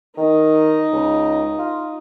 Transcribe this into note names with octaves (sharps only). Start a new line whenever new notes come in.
D#3 D#4
C#2
F4